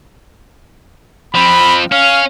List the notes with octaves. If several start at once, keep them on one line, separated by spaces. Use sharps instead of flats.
F3 C4 B5
C#4 F5